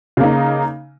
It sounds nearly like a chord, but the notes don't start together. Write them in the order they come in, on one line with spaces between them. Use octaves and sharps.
C#3 A#3 D#4